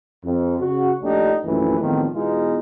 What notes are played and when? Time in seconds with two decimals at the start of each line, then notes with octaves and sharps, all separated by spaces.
0.24 F2
0.60 C#3 F#4
1.02 A#1 A3 D4 D#4 G4
1.45 A#1 F#2 E3 A3
1.80 E2 A2 D#3 F3 C4
2.14 E2 B2 G#3 D#4 F4